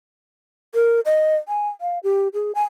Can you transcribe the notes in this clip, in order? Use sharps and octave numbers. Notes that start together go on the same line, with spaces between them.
A#4
D#5
G#5
F5
G4
G#4
G#5